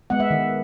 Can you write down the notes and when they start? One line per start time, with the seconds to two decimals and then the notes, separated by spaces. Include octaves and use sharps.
0.10 G#3 B3 F#5
0.20 E5
0.31 D#3